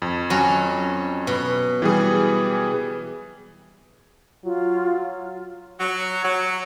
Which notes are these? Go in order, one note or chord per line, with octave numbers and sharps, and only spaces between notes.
F2
F#3 C#4
B2
E3 G3 G#4
F#3 F4
F#3
F#3